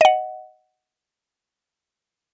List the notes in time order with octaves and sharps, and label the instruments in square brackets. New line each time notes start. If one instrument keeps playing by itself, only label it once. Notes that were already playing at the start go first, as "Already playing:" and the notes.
[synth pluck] D#5 F#5